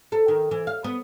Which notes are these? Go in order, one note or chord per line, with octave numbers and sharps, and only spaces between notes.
A4
D#3
E3
F5
B3